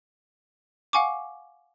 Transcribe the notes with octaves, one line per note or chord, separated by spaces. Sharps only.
F5 F#5 G#5 C#6 D6